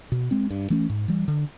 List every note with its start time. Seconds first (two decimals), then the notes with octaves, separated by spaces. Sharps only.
0.12 B2
0.31 G#3 C4
0.50 G2
0.70 E3 A3 C#4
0.89 G#2
1.08 E3 G3
1.28 D3